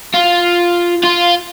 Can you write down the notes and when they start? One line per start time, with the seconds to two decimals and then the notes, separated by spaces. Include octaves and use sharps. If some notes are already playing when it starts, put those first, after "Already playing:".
0.14 F4
1.03 F4